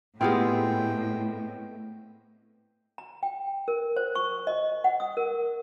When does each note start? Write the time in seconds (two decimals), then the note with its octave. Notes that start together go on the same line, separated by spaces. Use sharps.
0.21 A2 G#3 B3 C4 E4 F4 G4 G5
2.98 A#5
3.23 G5
3.68 A#4
3.97 C5
4.15 C#6
4.47 D#5
4.84 F#5
5.00 D#6
5.17 A#4